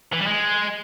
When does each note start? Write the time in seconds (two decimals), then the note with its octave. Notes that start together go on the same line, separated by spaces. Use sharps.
0.13 E3
0.20 G3
0.27 G#3